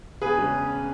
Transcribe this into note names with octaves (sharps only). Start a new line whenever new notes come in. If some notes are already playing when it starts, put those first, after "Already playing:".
E1 G#4 B4
C#3 G#3 C#4